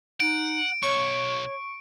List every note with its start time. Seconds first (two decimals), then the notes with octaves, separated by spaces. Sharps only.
0.20 D#4 F#5 D7
0.83 B1 C#5 C#6